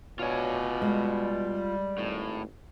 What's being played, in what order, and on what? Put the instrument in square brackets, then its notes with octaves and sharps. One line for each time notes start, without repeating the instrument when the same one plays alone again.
[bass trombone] B2 [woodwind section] D4 F#4 C#5 [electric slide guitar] F4 G#5
[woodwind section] G3 [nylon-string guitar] G#3
[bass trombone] G#1 [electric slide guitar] A2